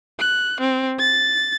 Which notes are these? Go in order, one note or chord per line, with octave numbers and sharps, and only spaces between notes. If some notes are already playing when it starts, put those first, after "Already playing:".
F#6
C4
A6